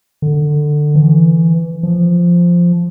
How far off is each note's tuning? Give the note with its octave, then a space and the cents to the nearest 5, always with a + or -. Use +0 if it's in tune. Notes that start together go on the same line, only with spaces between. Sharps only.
D3 +15
E3 +10
F3 -5